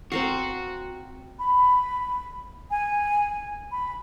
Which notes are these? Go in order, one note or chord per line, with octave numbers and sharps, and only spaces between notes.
C4 F#4 A#4 F5
B5
G#5
B5